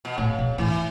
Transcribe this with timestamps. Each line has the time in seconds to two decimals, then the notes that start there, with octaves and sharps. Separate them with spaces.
0.05 B2
0.18 A2 C#3
0.38 B2
0.58 A2 E3